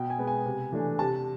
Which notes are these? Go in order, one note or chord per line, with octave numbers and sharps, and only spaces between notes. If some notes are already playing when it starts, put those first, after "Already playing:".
Already playing: B2 G5
G#5
G#3 B3
G#5
C3
E3 A3 D4
C3 A5